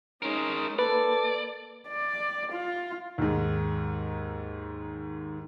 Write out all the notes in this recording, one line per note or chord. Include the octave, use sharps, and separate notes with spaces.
G#3 C#4 D#4 A#4
A#3 A4 B4 D5
D5
F4
D#2 G#2